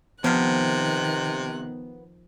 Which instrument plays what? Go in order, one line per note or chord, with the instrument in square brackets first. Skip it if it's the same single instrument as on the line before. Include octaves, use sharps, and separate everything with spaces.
[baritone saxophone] C3 [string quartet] D#3 F#6 [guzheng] F3 F5 [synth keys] B3